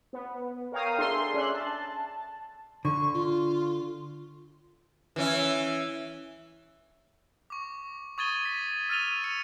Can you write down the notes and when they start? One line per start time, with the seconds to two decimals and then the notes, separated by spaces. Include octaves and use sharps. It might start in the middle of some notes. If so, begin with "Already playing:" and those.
0.13 B3
0.72 A#4 C#5 F5 G5 A#5 D#6
0.99 D4 G#4 A4 E5 C6
1.34 C#4 D5 E5 C6 F#6
1.54 A5
2.85 D3 C#6
3.14 F4
5.16 E3 C#4 E4
7.50 C#6 D6
8.18 C#6 D#6 G#6 A6 D#7 G7
8.45 B6
8.90 E6 F6 A6 D#7 F7 G7
9.24 C#7 D#7